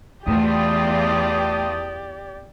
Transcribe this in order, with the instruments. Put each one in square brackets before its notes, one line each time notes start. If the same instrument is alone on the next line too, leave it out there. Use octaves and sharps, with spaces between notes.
[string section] E2 F4 [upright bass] A3 [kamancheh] G4 D5 [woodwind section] G5 A5 D#6